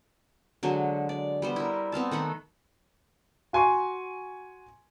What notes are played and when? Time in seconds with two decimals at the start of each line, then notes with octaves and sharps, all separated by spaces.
0.63 D3 F#3 G#3 C5
1.09 D5
1.42 G3 B3 C5
1.56 E4 A#4
1.92 B3 C4 F5 A5
2.11 D#3 A3 F#5 B5
3.53 F#4 G#5 C6 C#6